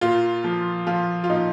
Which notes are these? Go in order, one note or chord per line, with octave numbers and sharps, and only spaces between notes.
A#2 F4
F3
F3 F4
F4
A#2 D#4